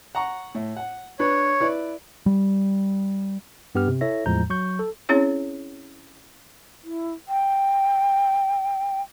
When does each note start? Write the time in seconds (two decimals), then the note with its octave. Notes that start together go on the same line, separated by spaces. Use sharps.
0.15 F#5 A#5 C#6
0.55 A2
0.77 F#5
1.19 D4 B4 C#5
1.61 E4 B4 D5
2.26 G3
3.75 G2 B3 G4 F6
3.88 C3
4.01 E4 A4 C#5 E5 A#6
4.26 E2 A2 F3 G#3 A#5 G6
4.50 F#3 C#6 G6
4.79 A4
5.09 C4 C#4 E4 G#4 C#5
6.83 E4
7.29 G5